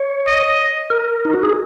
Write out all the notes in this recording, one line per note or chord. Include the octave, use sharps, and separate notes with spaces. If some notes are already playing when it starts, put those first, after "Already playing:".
Already playing: C#5
D#5
A#4
D#4
F#4
G#4